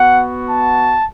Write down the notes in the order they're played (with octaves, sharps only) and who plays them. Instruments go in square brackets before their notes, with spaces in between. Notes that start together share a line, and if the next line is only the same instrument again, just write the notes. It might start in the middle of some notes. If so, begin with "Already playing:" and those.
Already playing: [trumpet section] B3 F#4 F#5
A5